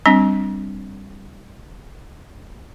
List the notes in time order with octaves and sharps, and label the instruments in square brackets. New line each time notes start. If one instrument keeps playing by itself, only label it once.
[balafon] G3 C4 D4